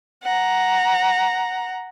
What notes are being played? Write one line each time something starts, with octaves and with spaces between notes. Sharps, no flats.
F#5 A#5